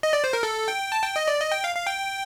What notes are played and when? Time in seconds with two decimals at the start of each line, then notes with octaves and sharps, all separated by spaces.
0.03 D#5
0.13 D5
0.24 C5
0.33 A#4
0.43 A4
0.68 G5
0.92 A5
1.03 G5
1.16 D#5
1.28 D5
1.40 D#5
1.52 G5
1.64 F5
1.75 F5
1.87 G5